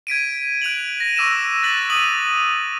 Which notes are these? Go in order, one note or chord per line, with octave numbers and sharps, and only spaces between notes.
G#6 B6 D7 D#7
F#6 D7 F7 F#7
A#6 D#7
C#6 D6 E6 A#6 D#7 E7
F#6 A6 B6 F#7
D#6 D#7 F#7